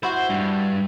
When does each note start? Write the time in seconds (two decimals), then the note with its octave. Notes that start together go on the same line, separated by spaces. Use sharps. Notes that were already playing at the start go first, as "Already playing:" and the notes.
0.03 E4 F#4 C5
0.30 G2